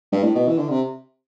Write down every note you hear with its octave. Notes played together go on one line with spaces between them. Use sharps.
G2
A2
B2
E3
D3
C3